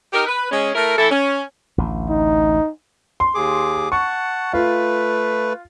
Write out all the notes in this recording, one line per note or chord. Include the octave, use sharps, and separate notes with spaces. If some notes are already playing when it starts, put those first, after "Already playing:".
D#4 G4 A#4
B4
G#3 C#4
A3 E4 A#4
E3 A3 E4 A4
C#4
A1 D2
D#4
C6
D#2 G#4 D6
F#5 A5 C#6
A3 F4 B4